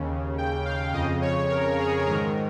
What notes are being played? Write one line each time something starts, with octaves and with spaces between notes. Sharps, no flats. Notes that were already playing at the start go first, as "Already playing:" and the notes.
Already playing: D#2 C#3
G5
F5
F2 C#3 D#5
C#5
A#4
G#4
G#2 D#3 A#4